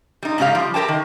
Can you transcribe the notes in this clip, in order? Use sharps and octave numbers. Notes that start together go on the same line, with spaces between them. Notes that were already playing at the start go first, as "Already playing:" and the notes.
G3 D#4
G#2 C#3 C#4 D#4 G4 F5
F3 G3
G4 A#4 C5 G5 A5
D#3